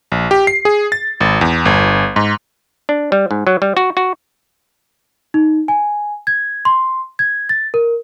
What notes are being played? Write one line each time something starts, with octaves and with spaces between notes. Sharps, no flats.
A#1
G4
C7
G#4
A6
G#1
E2
G1
G#2
D4
G3
G#2
F#3
G3
F#4
F#4
D#4
G#5
G#6
C6
G#6
A6
A#4